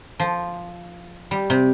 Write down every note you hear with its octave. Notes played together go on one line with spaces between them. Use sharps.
F3
G3
C3